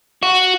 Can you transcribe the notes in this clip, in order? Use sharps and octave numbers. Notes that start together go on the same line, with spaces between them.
F#4